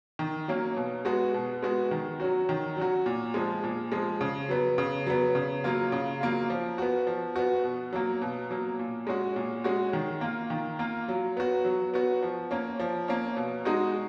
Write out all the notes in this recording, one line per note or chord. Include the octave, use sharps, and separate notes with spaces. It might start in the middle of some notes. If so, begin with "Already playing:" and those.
D#3
F#3 A#3 C#4
B2
G#3 B3 F#4
B2
G#3 B3 F#4
D#3
F#3 C#4 F#4
D#3
F#3 C#4 F#4
A#2
F3 G#3
A#2
F3 G#3
C#3
F#3 B3
C#3
F#3 B3
C#3
F#3 A#3 F4
C#3
F#3 A#3 F4
F3
B3 F#4
F3
B3 F#4
B2
F#3 A#3
B2
F#3 A#3
A#2
G#3 C#4 F#4
A#2
G#3 C#4 F#4
D#3
A#3 F4
D#3
A#3 F4
F#3
B3 F#4
F#3
B3 F#4
F3
A#3 C#4
F3
A#3 C#4
B2
G#3 D#4 F#4